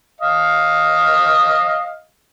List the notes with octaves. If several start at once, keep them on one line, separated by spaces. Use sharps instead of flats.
D#5 F5